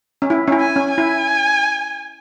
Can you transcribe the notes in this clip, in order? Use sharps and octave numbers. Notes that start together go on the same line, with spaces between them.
C#4
E4
C#4
E4
G#5
C#4
G#5
E4